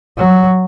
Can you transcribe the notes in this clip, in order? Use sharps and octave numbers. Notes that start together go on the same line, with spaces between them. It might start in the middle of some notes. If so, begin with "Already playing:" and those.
F#3